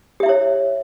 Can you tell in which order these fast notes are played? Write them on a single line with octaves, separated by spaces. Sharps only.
G4 E5 E4 C#5